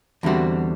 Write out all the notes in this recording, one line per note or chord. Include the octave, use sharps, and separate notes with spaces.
E2 D3 G3 C4 F#4